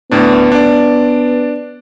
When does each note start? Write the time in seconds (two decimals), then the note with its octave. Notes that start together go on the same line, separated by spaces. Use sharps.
0.11 D2 A2 B3 D4
0.52 D4 D5